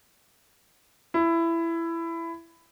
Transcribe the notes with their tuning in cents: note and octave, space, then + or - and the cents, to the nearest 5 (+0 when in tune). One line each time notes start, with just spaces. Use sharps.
E4 +15